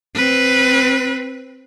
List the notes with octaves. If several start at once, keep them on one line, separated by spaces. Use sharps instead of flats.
C4 B4